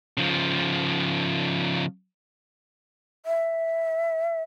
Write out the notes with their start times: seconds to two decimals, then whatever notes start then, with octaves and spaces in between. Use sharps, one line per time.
0.17 C#3 F3
3.26 E5